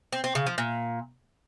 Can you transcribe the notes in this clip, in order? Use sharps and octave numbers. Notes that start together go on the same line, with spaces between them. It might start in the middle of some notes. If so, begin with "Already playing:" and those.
C4
C4
C#3
F3
A#2